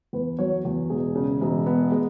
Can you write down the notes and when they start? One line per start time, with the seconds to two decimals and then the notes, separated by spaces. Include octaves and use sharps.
0.13 E2 B4
0.39 F#3 C#5
0.65 E2
0.90 E1 G#4
1.15 C#3
1.41 E1
1.66 B3
1.92 G#3